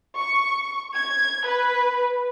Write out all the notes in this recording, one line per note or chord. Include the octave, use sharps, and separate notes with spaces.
C#6
G#6
B4